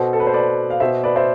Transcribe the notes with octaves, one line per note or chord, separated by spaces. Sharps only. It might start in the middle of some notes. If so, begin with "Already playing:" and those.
Already playing: B2 A4 C5
A4
B4
C5
B4 D5
F5
B2 C5 E5
B4 D5
C5 E5